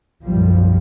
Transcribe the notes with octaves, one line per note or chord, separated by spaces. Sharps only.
B1 F#2 A#2 F3 G3